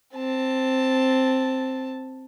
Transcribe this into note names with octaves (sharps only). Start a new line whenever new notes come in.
C4 A5